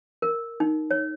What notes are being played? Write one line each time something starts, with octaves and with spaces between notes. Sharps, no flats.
A#4
D#4
C#5